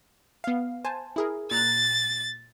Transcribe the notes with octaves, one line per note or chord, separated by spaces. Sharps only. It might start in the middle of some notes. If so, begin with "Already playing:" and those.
B3 F5
C5 G#5 A5
E4 G#4 A#4
A#2 A#5 F#6 A6